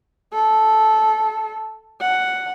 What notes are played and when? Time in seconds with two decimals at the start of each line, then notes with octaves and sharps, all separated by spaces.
0.33 A4
2.01 F#5